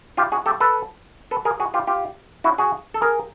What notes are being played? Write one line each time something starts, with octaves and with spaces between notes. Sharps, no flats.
F4 G4
F#4 G#4
G4 A4
A4 B4
A4 B4
G#4 A#4
F#4 G#4
F4 G4
F4 G4
E4 F#4
F#4 G#4
A4
G#4 A#4